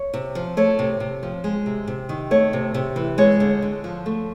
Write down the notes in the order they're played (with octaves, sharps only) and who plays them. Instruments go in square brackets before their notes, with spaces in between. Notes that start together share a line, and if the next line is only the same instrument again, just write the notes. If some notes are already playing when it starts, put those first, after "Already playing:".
Already playing: [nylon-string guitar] C#5
C3
F3
A3 C#5
C3
C3
F3
G#3
C3
C3
D#3
A3 C#5
C3
C3
E3
G#3 C#5
D3
D3
F3
A3